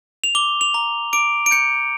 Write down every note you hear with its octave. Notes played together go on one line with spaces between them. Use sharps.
F7
D6 G7
F7
A#5
D6 D7
D7
G6 C#7